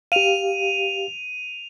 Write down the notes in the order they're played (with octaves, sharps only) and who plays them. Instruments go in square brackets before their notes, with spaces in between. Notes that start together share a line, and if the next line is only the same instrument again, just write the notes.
[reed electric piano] G4 F5 [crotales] D#7 F7